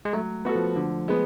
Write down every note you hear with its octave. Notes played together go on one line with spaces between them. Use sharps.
G#3
F#3 A3
B3 F#4 A4
F3
D3
G#3 B3